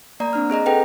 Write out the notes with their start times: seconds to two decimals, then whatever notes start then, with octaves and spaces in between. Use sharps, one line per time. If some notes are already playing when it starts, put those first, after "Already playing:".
0.20 A#3 D5 A#5
0.33 C4 D4 F6
0.50 C4 G#4 D#5 A#5
0.66 G#4 A4 B4 D#5 F#5 G5